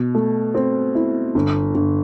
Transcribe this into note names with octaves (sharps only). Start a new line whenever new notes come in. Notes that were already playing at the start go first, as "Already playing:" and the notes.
Already playing: B2
A3
C4
E4
G1
G1